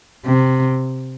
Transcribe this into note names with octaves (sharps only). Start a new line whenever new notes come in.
C3